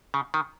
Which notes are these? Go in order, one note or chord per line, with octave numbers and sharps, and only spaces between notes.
C#3
D#3